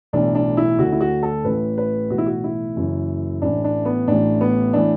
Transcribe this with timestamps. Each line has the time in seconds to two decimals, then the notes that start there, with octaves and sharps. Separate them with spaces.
0.13 B1 A2 E3 D4
0.35 D4
0.57 E4
0.78 D2 D3 F#4
0.92 E4
1.01 F#4
1.23 A4
1.44 A1 A2 E3 B4
1.78 B4
2.10 B1 A2 E3 F#4
2.18 E4
2.27 F#4
2.44 E4
2.76 F#1 F#2 E3
3.42 A1 A2 E3 D4
3.64 D4
3.85 B3
4.08 A1 A2 E3 D4
4.41 B3
4.73 A2 E3 D4